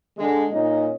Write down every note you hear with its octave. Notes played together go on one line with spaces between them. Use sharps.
D3 G#3
A#2 C#4 D#4 D#5